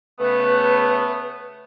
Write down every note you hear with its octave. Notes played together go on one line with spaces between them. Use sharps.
C#3 A3 B3 B4